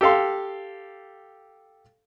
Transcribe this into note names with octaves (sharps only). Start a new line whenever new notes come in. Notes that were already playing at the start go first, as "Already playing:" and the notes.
G4 A4 F5 C6